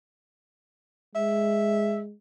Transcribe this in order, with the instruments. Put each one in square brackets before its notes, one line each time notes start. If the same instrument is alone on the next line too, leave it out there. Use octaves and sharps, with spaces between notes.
[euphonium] G#3 [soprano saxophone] E5